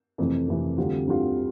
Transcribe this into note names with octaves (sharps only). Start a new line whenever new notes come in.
F2 C3 E3 A3
F2 C3 E3 A3
D2 D3 G3 C4 F4
D2 D3 G3 C4 F4